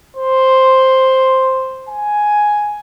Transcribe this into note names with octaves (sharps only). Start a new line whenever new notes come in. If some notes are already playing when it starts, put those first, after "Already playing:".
C5
G#5